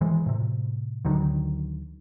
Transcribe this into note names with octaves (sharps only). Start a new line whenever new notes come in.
D#3 E3 G#3
A2 C3
D2 D3 D#3 F#3